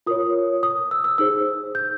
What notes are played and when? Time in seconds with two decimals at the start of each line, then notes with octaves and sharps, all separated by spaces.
0.06 F4 A#4 C#5 D#6
0.63 D#6
0.91 E6
1.04 E6
1.18 D#4 G#4 C5 E6
1.75 G6